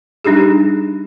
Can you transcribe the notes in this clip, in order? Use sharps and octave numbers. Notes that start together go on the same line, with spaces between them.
G3 D4 D#4 G4 G#4